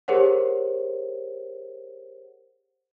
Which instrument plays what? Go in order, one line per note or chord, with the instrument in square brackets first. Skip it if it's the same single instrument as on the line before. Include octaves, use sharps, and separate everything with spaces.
[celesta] G4 G#4 A#4 C5 C#5 F#5